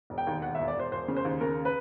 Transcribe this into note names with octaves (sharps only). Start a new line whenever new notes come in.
E1
G5
D#2
E1 F#5
E5
E1
D5
E1 C5
E1 C5
C#3
C5
D#2
C#3 A#4
B4